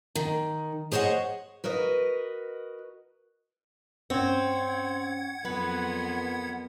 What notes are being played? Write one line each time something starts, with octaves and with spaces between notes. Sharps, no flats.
D#3
G#4 C5 C#5 D#5 F#5
F#4 A#4 B4 D#5
G2 C4 C#4 F#5 C#6 G#6
F2 F#3 B3 A#4 B4